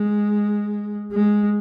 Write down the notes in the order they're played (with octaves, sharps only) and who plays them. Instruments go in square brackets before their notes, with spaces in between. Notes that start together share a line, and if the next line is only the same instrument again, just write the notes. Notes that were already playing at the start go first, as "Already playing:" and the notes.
Already playing: [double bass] G#3
G#3